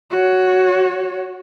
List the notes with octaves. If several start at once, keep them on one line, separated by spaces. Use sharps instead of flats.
F#4 C#5